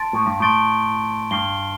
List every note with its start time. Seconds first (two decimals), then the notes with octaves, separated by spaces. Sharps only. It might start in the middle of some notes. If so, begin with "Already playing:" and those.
Already playing: A5 C6 A6 D7
0.13 A2
0.26 G2
0.40 A2 A5 C6 A6 D7 G7
1.31 G2 F6 C7 G7